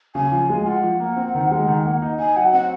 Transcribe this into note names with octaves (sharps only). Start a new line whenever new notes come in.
C#3 G#5
F3
G#3
F4 F#5
F3
A#3
C4
D#3
G#3
D#3
A#3
D#4
D#4 G#5
F#3 F#5
C4 F#5